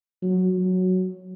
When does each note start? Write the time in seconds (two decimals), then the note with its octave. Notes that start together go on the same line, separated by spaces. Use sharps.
0.23 F#3
0.58 F#3